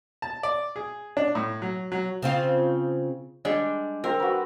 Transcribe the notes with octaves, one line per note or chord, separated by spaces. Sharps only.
A5
D5
G#4
D4
A2
F#3
F#3
C#3 C4 F4
G3 G#3 D4
C4 A#4
F#4 B4